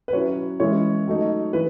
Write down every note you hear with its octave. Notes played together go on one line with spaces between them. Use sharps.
B4
F#3 C#4 E4 C#5
E3 G#3 C#4 E4 C#5
F#3 A3 D#4
E3 B4